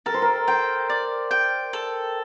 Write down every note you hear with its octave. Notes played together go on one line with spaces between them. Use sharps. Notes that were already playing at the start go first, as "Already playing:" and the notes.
A4 A#4
C5
A#4
C5 G5
D5
G5
A4